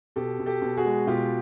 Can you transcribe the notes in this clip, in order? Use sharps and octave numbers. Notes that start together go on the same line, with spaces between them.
B2 G4 A4
B2
G4 A4
B2
F#4 G#4
G#3
B2 F4 G4